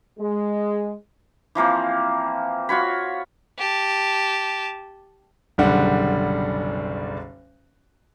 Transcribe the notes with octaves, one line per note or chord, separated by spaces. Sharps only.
G#3
E3 F3 A#3 C4
F4 F#4 C#5 B5
G4 A5
F#1 B1 D3 G3 F#5